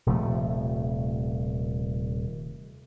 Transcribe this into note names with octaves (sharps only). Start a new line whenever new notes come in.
D#1 C3 F3 A3